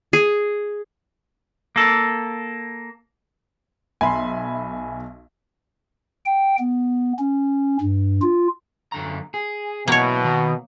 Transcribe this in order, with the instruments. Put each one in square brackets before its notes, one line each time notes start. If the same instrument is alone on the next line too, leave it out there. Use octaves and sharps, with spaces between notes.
[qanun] G#4
[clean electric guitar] A#3 A4
[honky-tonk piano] B1 E5 [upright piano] G#5 B5 C6
[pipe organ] G5
B3
C#4
G2
F4
[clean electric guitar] F#2 D3 A#5
G#4
[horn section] B2 [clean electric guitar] F#3 B3 E4 [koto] A#3 C#5
[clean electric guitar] D#3 A#5